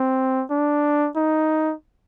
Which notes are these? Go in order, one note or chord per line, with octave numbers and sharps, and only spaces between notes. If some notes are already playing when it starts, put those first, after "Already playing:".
Already playing: C4
D4
D#4